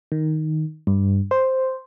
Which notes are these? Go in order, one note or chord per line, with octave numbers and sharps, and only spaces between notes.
D#3
G2
C5